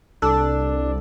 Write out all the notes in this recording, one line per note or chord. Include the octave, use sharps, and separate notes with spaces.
C2 D4 A4